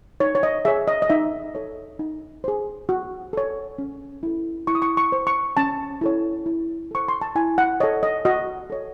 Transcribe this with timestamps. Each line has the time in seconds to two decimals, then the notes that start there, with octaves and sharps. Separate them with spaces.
0.20 D#4 C#5
0.35 C#5
0.43 D#5
0.65 G#4 C#5 E5
0.88 D#5
1.02 D#5
1.10 D#4 E5
1.55 A4 C#5
1.99 D#4
2.44 G#4 C5
2.89 F#4
3.33 A4 C#5
3.78 C#4
4.23 E4 A4
4.67 E4 C#6
4.75 D#6
4.82 C#6
4.97 C#6
5.12 C5
5.27 C#6
5.57 C#4 A5
6.01 E4 A4 C#5
6.46 E4
6.91 A4 C5 C#6
7.08 C6
7.21 A5
7.35 E4 G#5
7.58 F#5
7.80 A4 C#5 D#5
8.03 D#5
8.25 F#4 D#5
8.70 A4 C#5